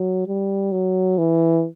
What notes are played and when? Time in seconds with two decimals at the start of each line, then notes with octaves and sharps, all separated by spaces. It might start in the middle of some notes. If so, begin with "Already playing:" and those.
Already playing: F#3
0.27 G3
0.72 F#3
1.18 E3